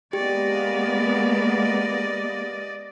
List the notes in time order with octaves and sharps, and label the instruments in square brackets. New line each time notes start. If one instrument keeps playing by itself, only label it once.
[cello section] G#3 A#3 B3 [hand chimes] G4 [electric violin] D5 D#5